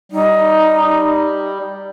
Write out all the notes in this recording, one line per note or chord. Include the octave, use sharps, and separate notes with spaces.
G3 D#4